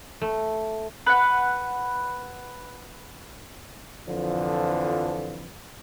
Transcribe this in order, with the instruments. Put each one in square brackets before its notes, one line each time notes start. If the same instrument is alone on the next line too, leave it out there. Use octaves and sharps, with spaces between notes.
[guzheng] A3
[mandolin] B4 F#5
[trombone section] F2 D3 E3 F3